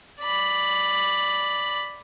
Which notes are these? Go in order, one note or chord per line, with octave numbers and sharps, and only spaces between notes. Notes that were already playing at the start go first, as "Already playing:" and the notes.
D5 B5